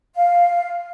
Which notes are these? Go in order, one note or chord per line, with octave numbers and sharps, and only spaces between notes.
F5